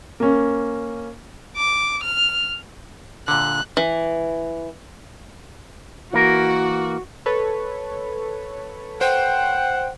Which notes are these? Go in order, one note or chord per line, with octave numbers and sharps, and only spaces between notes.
A#3 C#4
D6
F6
A#2 D3 F#6
E3
E3 A#3 F#4 A#4
A4 B4 C#5
C5 F#5 G5